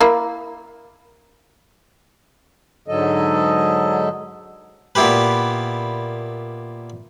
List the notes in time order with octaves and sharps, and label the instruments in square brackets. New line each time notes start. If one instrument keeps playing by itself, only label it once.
[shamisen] A#3 E4
[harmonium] G#2 D3 F#3 A4 D#5
[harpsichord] A#2 B3 E4 G4 B4